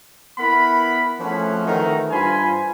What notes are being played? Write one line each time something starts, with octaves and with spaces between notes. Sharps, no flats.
B3 E4 A#4 F#5 B5
F3 A3 C4 C#4 G#4 F#5
D#3 E3 A3 D#4 F#4 A#5
G2 F4 C5 G#5 B5